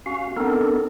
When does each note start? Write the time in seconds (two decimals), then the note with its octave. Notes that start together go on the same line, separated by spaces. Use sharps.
0.06 C#4 F#4 F5
0.37 B3 C4 D4 D#4 A4 A#4